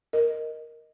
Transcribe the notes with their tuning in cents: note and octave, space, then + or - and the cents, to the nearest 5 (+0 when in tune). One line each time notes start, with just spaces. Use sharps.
A#4 +0 D#5 +0